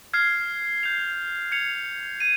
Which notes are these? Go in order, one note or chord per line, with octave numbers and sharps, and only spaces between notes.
F6 G#6 C7
G6 C7 F7
G#6 C#7 F7
G#6 D#7